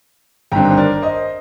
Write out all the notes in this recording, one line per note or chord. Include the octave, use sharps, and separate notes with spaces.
G1 G2 D#3 G3 C4 G5 A#5
C5
A#4 D5
C5 D#5